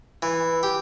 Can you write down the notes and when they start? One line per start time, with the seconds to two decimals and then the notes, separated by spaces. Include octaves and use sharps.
0.22 E3
0.63 G4